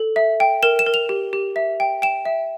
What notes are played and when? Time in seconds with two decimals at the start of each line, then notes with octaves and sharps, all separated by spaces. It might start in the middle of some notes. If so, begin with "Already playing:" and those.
Already playing: A4
0.16 E5
0.40 G5
0.63 A#4 E7
0.79 E7
0.86 A#4
0.94 F7
1.09 G4
1.33 G4
1.56 E5
1.80 G5
2.02 G5 E7
2.25 E5